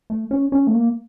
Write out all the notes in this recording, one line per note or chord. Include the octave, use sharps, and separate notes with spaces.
A3
C#4
C#4
A3
A#3